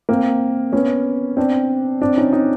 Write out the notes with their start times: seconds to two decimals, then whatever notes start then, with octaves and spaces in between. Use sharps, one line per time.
0.09 A#3 C4
0.73 B3 C#4
1.37 C4 D4
2.01 C4 D4
2.18 C#4 D#4
2.33 C#4 D#4